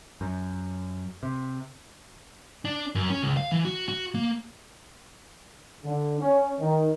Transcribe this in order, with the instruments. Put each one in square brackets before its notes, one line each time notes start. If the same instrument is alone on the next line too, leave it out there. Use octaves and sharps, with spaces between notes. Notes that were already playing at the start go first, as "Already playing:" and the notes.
[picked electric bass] F#2
C3
[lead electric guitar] D4
F#2
C#4
C#2
F5
E3
F#4
F#4
A#3
[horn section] D3
C#4
D#3